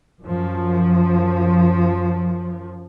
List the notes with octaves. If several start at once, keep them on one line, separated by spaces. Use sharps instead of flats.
F#2 F3